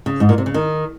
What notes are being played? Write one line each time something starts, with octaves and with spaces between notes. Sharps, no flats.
C#3
G#2
A#2
C3
C#3
D#3